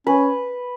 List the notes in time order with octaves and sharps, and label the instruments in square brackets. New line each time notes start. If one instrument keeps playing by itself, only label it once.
[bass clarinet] C#4 [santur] B4